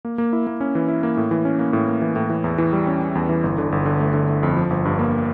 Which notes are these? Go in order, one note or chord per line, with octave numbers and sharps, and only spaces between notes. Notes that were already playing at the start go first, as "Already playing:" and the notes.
A#3
A#3
E4
A#3
C#4
E3
E4
A#3
A2
E3
C#4
A#3
A2
A#3
E3
A2
E3
E2
E3
G3
C#4
C#4
E2
E3
G1
D3
G1
D3
A3
D3
A3
F2
F3
G1
G2
A#3